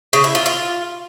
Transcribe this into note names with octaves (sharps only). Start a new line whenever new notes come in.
C#3
E4
F4
F4